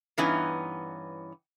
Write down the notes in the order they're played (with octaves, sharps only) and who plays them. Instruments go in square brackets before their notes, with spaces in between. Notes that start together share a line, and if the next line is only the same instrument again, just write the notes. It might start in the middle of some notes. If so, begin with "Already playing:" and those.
[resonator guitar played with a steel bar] G2 E3 B3 C#4 D#4